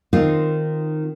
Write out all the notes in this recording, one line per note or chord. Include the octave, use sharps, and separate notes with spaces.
D#3 C4 D#4 F4